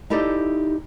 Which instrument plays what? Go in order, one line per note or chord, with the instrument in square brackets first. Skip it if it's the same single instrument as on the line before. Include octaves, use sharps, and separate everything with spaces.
[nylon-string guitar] D#4 E4 G4 A4 D5